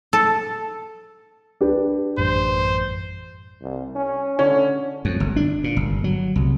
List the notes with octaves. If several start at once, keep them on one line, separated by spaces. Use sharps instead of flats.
A4
D4 G4 B4
A1 F#2 G3 C5
C2
C#4
D3 C#4
F2
G1
D4
A#2
G1
F#3
C2